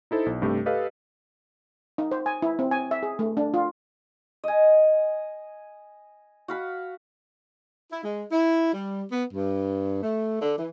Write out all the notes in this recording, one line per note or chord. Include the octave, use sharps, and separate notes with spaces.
D#4 E4 A4 C5
B1
G2 C3 A3 G4
G4 A4 B4 D#5 F5
D#4
C5
G#5
E4
C4
G#5
E5
G#4
A3
D4
F4
D#5 G#5
F#4 F5 B5
E4
G#3
E4
G3
B3
G2
A3
D3
E3